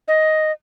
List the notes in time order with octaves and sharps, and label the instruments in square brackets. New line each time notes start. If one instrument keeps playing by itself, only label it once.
[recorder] D#5